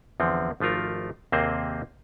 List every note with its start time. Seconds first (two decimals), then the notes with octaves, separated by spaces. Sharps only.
0.20 E2 D3 F3 C4
0.60 G#1 F3 A3 F4 A#4
1.32 D#2 C3 A#3 C4 G#4 C5